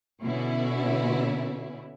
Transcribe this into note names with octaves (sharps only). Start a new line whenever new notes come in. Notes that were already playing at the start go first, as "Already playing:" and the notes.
B2 D3 C#4 E4